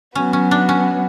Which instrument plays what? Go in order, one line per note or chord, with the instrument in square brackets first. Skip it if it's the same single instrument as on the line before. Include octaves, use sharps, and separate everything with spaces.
[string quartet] F#3 B3 F#4 [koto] C#4
[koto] C#4
D4
C#4